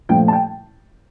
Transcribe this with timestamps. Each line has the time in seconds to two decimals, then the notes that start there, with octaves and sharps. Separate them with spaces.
0.09 A#2 F3 A3 G5
0.28 A5
0.33 G5